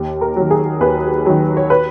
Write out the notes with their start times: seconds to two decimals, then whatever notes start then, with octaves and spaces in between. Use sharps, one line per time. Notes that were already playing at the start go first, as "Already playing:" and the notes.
Already playing: D#2
0.21 A#4
0.36 D#3 F#3
0.51 G#4
0.81 D#2 B4
1.26 D#3 F#3
1.57 C#5
1.70 B4